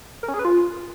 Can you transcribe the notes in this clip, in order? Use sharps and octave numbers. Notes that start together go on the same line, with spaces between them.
A#4
C#4
G#4
B4
F4